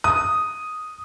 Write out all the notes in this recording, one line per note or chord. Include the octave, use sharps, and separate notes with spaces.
D#6